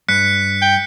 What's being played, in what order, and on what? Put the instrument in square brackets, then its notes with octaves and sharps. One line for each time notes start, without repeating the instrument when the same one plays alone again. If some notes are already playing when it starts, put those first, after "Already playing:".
[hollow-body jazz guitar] G2 [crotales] F#6 B6 C#7
[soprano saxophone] G5